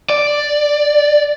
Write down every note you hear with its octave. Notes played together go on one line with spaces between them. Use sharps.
D5